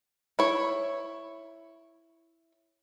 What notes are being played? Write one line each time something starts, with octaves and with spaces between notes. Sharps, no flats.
E4 C#5